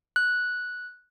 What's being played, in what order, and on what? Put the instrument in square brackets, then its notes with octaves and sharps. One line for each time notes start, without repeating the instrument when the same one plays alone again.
[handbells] F#6